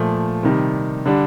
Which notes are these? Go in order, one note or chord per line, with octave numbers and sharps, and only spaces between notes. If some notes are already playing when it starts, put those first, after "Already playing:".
Already playing: A#2 F3 A3
C3 D#3 G3
D3 G3 D4